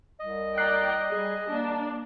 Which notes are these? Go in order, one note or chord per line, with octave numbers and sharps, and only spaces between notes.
C2 D#5
D5 G5 A#5 F#6 C7
G3 G#4
A#3 D4